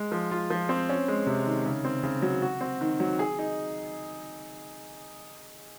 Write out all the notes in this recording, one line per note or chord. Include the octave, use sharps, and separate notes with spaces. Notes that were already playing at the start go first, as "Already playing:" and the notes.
Already playing: G#3
F3
F4
F3
C4
C#4
G#3
C3
D#3
C#3
C4
C#3
F#3
F#4
C4
D#3
F#3
G#4
D#4